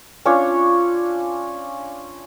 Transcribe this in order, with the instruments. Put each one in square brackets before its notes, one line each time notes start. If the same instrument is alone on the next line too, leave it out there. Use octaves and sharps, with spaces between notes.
[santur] C#4 D4 F4 C#5